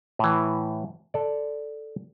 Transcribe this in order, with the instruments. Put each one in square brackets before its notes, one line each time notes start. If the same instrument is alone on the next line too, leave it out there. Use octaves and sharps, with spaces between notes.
[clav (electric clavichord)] A2 E3
A4 D5